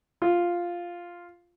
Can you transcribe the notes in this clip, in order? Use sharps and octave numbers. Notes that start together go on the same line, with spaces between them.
F4